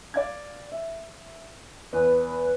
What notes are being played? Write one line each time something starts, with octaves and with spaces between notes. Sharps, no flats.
D5 F5 G#6
E5
E2 B4